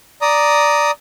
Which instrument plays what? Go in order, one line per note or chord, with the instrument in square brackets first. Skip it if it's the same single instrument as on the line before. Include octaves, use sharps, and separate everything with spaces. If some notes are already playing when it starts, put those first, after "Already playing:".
[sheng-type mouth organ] D5 A#5 D#6